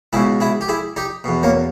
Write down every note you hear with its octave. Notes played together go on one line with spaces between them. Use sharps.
C#2 B2 E4 G#4
E4 G#4
G4
E4 G#4
D#4 G4
E2 B2
A#3 C#4